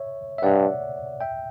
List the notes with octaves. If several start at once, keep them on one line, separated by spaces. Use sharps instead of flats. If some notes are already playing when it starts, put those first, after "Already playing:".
Already playing: C#5 E5
E5
G2 D5 F#5
E5 G5